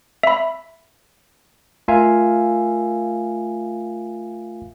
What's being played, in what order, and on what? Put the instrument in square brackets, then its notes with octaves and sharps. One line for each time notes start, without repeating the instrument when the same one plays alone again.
[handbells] E5 B5
[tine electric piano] A3 F4 A#4 E5 F5 G#5